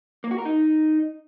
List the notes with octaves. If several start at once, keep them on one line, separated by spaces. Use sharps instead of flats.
A#3
F#4
A#4
D#4